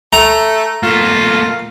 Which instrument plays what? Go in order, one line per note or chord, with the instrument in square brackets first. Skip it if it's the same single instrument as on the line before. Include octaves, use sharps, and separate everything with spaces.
[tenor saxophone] A3 [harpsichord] A#5
[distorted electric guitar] A3 A#3 [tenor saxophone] F4